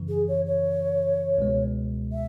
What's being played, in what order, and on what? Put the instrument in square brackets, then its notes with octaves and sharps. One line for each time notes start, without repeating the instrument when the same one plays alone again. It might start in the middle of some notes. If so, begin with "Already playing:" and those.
Already playing: [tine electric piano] F#2 C#3 E3
[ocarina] G#4
C#5
C#5
[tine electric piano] C#2 B2 G#3
[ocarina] E5